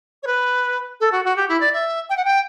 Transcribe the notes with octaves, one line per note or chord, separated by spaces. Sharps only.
C#5
B4
A4
F#4
F#4
G4
E4
D5
E5
G5
F#5
G5